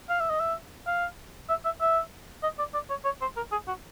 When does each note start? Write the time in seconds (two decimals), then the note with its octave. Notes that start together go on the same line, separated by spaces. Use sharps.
0.10 F5
0.20 E5
0.30 D#5
0.40 E5
0.87 F5
1.50 E5
1.65 E5
1.81 E5
2.43 D#5
2.59 D5
2.74 D5
2.90 C#5
3.05 C#5
3.21 C5
3.37 A#4
3.52 G#4
3.68 F#4